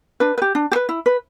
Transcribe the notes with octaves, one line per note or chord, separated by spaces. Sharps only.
D4 B4
B4
G4
D4
G4
B4
E4
B4